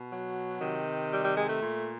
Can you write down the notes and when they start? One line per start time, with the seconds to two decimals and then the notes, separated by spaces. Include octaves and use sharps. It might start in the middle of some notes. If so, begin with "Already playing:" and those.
Already playing: B2
0.11 F#3
0.61 C3 D#3
1.12 G3
1.24 G3
1.37 G#3
1.49 A3
1.62 A#2